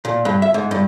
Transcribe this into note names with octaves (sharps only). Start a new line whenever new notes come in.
A#2
G2
E5
G#2
G2